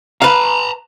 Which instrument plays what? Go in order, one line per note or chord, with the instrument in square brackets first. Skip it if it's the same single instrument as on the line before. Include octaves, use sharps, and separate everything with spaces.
[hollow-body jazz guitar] B4 F5 [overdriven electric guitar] A5 A#5